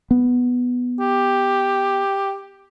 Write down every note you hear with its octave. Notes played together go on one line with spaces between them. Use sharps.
B3
G4